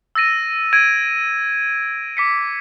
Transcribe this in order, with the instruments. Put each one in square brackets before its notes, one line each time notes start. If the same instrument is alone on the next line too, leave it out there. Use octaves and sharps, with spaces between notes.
[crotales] E6 A6 A#6 D#7
G#6 D7 D#7
D6 B6 C#7